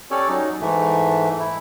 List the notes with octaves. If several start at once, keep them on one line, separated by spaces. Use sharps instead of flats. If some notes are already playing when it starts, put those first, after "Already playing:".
C#4 G4 A4 C#5 D5
F#3 D#4
G#2 E3 A3
E4